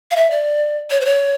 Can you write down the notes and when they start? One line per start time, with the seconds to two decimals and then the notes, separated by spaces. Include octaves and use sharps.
0.11 F5
0.16 E5
0.30 D5
0.91 C#5
1.01 C5
1.05 C#5